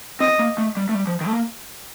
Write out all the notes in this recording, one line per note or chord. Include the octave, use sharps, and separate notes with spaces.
C4 D#5
A#3
A3
G3
A3
G3
F3
D#3
A3
A#3